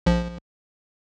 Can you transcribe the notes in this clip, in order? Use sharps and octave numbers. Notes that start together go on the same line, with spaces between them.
A#1 F3